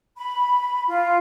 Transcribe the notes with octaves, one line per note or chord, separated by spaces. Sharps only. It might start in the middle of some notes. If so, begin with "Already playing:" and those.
B5
F4